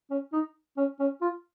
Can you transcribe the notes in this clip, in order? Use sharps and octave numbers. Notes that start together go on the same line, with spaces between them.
C#4
D#4
C#4
C#4
F4